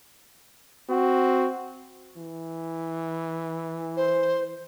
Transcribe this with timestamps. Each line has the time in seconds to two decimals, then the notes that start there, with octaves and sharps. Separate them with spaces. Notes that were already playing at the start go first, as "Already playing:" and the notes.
0.90 C4 F#4
2.17 E3
3.97 C5